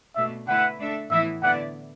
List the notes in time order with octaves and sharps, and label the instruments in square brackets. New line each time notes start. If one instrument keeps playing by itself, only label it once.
[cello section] B2 A3 D4 [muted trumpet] E5
[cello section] D3 A3 E4 B4 E5 [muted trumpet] F#5
[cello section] A3 D4 A4 E5
[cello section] A2 E3 B3 E4 [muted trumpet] E5
[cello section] D3 B3 E4 D5 [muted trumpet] F#5